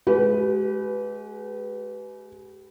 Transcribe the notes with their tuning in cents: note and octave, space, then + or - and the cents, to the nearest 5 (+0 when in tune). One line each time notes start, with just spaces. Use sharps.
G#3 +30 G4 -35 B4 +0